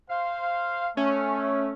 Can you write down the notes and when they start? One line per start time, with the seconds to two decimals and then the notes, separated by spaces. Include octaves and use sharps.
0.10 C5 F5
0.97 A3 C#4